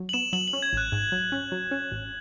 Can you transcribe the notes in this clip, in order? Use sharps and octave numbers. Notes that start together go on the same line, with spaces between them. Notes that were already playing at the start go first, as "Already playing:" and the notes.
Already playing: F#3
F#7
B3 E7
F#3 F#7
F#7
C#4
G#6
A1 F#6
G#2
F#3
C#4
F#3
C#4
A1